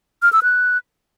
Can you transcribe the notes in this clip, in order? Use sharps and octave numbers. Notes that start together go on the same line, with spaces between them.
F6
E6
F#6